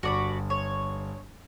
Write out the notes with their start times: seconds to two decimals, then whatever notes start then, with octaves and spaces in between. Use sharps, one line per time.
0.03 G1 F#4 D5 B5
0.50 C#5